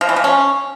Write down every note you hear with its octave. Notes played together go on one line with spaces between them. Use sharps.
F3
E3
F3
C#4